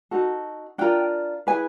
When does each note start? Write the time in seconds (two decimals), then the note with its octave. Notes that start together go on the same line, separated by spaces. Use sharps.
0.11 D#4 F#4 A4
0.78 D4 F4 A#4 G5
1.47 E4 G#4 B4 G#5